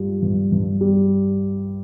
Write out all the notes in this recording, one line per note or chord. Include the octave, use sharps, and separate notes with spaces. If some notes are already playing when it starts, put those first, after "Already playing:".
Already playing: G2 G3 F4
G2
G2
G3